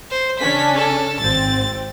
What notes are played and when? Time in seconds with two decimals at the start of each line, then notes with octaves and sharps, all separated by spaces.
0.10 C5
0.40 C#3 C#4 D4 B6
0.76 A4
1.21 G#1 C4 A6